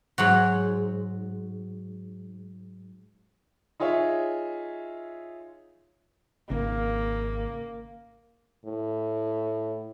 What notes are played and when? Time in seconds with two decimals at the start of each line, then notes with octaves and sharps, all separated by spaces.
0.18 G#2 F#3 F#4
3.80 D#4 F4 G#4 C#5 E5
6.50 G#1 C#3 A#3
8.66 A2